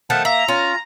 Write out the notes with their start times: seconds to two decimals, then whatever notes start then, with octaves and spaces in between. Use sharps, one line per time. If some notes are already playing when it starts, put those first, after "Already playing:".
0.10 D#3 F3 A3 F#5 A5
0.25 A#3 E5 A#5
0.48 C#4 F4